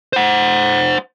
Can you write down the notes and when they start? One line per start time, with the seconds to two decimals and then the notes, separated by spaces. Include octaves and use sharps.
0.13 C5 F#5